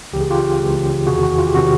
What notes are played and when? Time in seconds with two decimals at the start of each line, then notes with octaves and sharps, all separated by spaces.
0.13 C#2 C#3 E3 G4
0.21 G#4
0.30 F4 G4
0.60 C#2 C#3 E3
1.07 E2 C3 D#3 F#4 G#4
1.23 F#4
1.38 F4
1.47 G4
1.55 C3 D#3 F#4